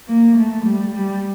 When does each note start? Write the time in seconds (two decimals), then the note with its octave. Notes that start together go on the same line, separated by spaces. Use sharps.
0.08 A#3
0.37 A3
0.65 G3
0.94 G3